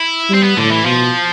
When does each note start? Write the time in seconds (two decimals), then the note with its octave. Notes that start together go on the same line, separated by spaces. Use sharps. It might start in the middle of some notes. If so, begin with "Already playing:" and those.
Already playing: E4
0.29 G3 C4
0.43 B3
0.57 A2 D3
0.71 E3
0.85 B2 F3